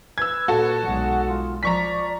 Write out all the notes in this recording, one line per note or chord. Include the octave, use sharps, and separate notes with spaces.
B4 E6 G#6
A#2 F#4 A4
B1 G#3 F#5
F4
F3 D5 A#5 C#6 B6